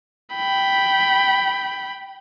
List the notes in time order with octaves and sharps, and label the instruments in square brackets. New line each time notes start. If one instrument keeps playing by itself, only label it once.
[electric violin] G5 B5